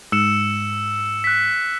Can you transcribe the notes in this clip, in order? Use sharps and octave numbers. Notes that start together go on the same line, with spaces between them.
G#2 E6 C#7 E7
F#6 B6